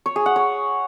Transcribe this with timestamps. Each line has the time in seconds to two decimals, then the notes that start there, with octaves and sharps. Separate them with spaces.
0.06 C#5
0.16 G#4
0.26 F#5
0.36 C#5